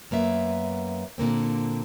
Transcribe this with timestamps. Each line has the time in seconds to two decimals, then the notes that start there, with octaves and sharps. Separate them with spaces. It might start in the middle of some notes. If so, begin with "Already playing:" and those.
0.11 F#2 A#3 B3 E5
1.18 A#2 D3 A#3 C4